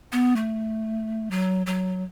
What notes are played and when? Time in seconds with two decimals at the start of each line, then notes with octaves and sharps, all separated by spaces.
0.12 B3
0.36 A3
1.31 F#3
1.66 F#3